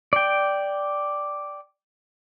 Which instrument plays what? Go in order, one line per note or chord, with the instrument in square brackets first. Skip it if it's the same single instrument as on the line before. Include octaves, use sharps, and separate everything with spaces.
[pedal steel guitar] D5 G5